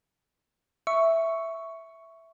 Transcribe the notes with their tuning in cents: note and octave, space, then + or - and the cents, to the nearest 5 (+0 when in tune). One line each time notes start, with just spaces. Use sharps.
E5 +0 C#6 +5